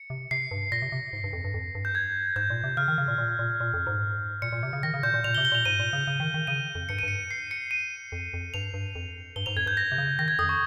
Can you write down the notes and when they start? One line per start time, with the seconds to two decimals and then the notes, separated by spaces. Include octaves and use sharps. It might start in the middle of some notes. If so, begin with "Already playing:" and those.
Already playing: C#7
0.10 C3
0.31 C3 C7
0.51 G2
0.72 A#2 A#6
0.82 C3
0.92 C3
1.13 G#2
1.24 G2
1.33 F2
1.44 G2
1.54 F2
1.75 G2
1.85 G6
1.95 G#6
2.36 G#2 G6
2.50 A#2
2.64 C3
2.77 C#3 F6
2.88 D#3
2.98 C#3
3.08 A#2
3.18 A#2
3.39 A#2
3.60 A#2
3.74 F2
3.87 G#2
4.42 A#2 C#7
4.52 A#2
4.63 C3
4.73 C#3
4.83 D#3 A#6
4.94 C#3
5.03 A#2 G6
5.14 A#2
5.24 A#2 F7
5.35 G7
5.38 C3
5.45 G7
5.52 A#2 F7
5.65 G#2 D#7
5.79 A#2
5.93 C#3
6.07 C#3
6.20 D#3
6.34 D#3
6.47 C#3 D#7
6.75 F2
6.89 G2 C#7
6.99 D#7
7.03 G2 C#7
7.31 C7
7.51 C#7
7.71 D#7
8.12 F2
8.34 F2
8.54 G2 F7
8.74 G2
8.95 F2
9.36 G2 G7
9.46 G#2 F7
9.56 F2 G#6
9.66 G2 G6
9.77 A#6
9.92 C3
9.98 C#3
10.19 D#3 A#6
10.28 G#6
10.39 F2 D#6
10.49 C#6